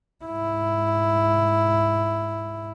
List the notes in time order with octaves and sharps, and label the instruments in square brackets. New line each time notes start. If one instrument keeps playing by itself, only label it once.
[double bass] G#2 E4